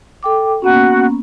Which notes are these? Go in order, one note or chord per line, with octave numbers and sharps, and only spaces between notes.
A4 G5 D6
A#3 B3 C#4 F#4